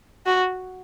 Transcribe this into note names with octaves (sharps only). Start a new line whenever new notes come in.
F#4